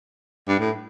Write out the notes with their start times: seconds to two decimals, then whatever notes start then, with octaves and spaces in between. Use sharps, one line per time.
0.48 G2
0.60 A2